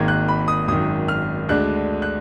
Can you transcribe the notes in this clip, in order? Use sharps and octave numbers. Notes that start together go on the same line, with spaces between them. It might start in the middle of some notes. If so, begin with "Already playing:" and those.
Already playing: G#1 G#2 D#3 A#3 G#6
F#6
B5
D#6
G#1 F#2 D#3 D#6
F6
D2 D3 G#3 D4 F#6
F#6